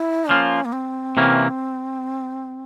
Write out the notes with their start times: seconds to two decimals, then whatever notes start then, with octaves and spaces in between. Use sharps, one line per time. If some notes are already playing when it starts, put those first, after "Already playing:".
Already playing: E4
0.29 F3 A#3 C#4 F4
0.65 A#3
0.72 C4
1.17 C3 E3 A#3 C#4